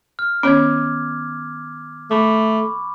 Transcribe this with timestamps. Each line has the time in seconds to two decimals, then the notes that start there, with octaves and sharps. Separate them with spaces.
0.19 F6
0.43 D#3 B3 C#4 C#5 D6 G#6
2.11 A3 B5 C#6 D6